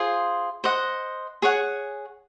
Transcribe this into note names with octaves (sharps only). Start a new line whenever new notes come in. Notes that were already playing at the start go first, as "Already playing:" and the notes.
Already playing: F4 G#4 C5
C5 D#5 F#5
G#4 C#5 F#5